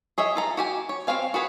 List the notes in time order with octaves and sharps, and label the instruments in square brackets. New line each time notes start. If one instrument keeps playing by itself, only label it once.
[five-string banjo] G#4 C#5 D#5 E5
F4 A4 A#5
F#4 G4 G#5
C#5
C4 B4 C#5 F5 G#5
F#4 G#4 B4 C#5